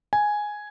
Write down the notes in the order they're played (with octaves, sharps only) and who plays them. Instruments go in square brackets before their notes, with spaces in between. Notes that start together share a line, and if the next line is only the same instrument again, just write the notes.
[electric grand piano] G#5